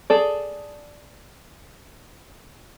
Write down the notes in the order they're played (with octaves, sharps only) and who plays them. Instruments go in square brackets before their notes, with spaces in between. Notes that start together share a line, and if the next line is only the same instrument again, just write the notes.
[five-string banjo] G#4 A4 D5